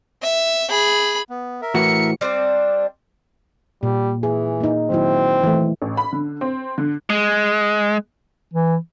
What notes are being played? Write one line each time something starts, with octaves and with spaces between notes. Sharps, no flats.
E5
G#4 B5
B3
A#4 E5
A2 E3 F#4 C#7
G3 C4 D4 C5
A#2 G3
E3 G#4
A#3 D#4
D#3 F#3 C4 E4
E3 A3
A1
B5
D3
C4
D3
G#3
E3